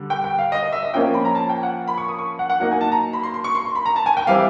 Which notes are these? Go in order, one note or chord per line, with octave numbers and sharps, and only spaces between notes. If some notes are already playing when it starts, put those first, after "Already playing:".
Already playing: D3 G3
G5
G5
F5
D#5
D#5
E5
D#5
F3 A#3 C#4 F4 G5
B5
A#5
A5
G5
F#5
B5
C#6
D#6
C#6
F#5
F#5
F#3 A#3 D#4 F#5
G#5
A5
A#5
B5
C6
C6
C#6
C6
C6
B5
A#5
A5
G#5
G5
E3 G3 C4 E4 F5